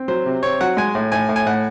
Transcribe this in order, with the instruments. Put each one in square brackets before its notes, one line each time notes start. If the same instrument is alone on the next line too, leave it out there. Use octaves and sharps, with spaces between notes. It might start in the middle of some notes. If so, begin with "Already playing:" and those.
Already playing: [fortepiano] C4
F#3 C5
C3
C4 C#5
F#3 F#5
G#3 G#5
A2
A2 G#5
A2
G#5
A2 F#5